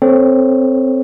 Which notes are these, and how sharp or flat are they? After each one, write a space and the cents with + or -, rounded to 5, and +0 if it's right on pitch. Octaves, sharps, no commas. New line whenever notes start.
C4 +0 A4 -15 C#5 +0